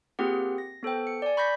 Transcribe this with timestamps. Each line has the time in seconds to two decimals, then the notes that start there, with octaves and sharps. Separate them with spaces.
0.19 A#3 C4 F4 G4 G#4 F#5
0.58 A#6
0.83 B3 A4 C5 G5
1.07 C#7
1.22 D5 G#5
1.37 B5 C#6 G6 A#6 B6